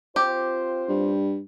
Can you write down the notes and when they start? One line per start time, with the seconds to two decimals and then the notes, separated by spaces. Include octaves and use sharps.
0.16 C4 F4 G4 C5
0.89 G2